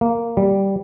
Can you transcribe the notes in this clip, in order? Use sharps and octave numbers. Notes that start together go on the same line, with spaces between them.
A#3
G3